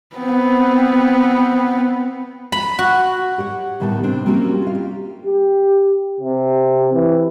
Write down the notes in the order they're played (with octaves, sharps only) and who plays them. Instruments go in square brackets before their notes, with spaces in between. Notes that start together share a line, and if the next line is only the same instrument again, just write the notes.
[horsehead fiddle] B3 C4
[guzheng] B5
F#4
[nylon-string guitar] G4 C#5 F#5
A2 D#3 G3 B3 A5
C3 C4 D4
G3 A#3 C4 C#4 F#4 G4
F4 F5
G4
[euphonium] G4
C3
E3